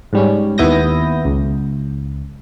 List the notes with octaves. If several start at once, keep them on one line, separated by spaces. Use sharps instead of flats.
G#2 G3 C#4
D#2 B3 E4 D#6 G6 A#6
C#2